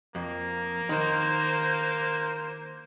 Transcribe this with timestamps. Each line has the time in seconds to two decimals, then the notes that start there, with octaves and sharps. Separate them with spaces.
0.15 F2 A#3
0.89 D#3 C5